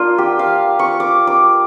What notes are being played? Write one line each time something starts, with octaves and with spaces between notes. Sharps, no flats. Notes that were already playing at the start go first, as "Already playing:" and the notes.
Already playing: A#3 D4 F4
G4
F5
C#6
D6
D6